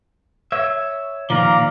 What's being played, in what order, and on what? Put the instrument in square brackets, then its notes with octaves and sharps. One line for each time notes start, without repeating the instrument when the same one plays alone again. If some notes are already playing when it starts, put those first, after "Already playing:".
[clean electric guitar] C#5 E5
[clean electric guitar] A#2 D#3 F3 [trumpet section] D5 F5 A#5